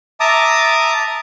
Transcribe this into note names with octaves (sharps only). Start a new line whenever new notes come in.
E5 A5 A#5 D6 D#6